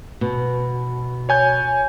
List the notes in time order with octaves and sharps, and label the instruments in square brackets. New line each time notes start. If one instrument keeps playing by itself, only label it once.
[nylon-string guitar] B2
[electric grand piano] C#5 G#5 G6